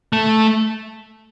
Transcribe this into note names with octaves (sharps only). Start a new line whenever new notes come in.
A3